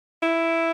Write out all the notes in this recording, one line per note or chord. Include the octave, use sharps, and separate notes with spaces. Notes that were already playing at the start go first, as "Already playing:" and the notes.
E4